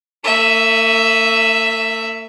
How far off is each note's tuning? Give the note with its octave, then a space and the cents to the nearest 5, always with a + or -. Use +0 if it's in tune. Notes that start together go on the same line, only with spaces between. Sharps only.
A3 +45 E5 +0